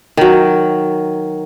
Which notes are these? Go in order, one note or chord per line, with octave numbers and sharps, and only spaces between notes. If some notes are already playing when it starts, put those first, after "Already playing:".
D#3 F#3